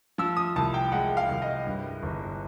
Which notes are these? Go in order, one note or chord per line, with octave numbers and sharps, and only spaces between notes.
F3 E6
D#6
C2 A5
G5
G#3 F#5
F5
C2
D#5
G2
G1